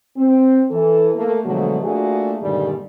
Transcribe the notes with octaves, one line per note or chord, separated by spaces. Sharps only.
C4
E3 A4
A3 A#3
B2 D3 F3 F#3 G#3 A3
A3 A#3 D4 F4 F#4 G#4
G2 A#2 D3 D#3 G3 G#3